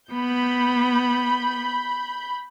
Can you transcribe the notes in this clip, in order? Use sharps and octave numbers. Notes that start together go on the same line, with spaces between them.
B3 B5 G6